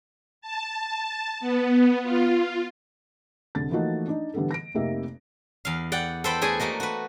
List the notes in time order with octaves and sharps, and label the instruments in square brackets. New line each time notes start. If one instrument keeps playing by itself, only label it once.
[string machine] A5
B3
F4
[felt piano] C2 D3 A6
E3 F3 A3 A#3 D#4 F#4
D4 D#4
D3 E3 G3 B3 D4 A4
A#6 D7
F1 C3 A#3 D#4 G4 E5
[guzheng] E2 F5
D5 F#5 G5
A4 B4 C5 G5 B5
A3 G#4 D5 G#5
A3 A#3 F#4 D#5
F#4 B4